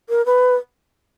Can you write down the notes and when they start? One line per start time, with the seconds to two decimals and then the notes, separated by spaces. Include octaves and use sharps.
0.09 A#4
0.26 B4